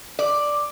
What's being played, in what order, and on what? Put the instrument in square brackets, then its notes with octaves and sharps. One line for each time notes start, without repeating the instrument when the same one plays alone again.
[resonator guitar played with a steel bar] D5